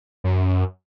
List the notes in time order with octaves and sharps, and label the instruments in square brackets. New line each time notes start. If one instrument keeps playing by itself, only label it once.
[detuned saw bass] F#2